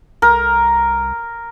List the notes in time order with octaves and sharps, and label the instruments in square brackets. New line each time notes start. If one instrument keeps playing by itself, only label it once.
[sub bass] C2 [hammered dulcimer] A#4